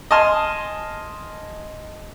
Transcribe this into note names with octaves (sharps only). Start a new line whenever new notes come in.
D#5 G#5 A5 C6 F6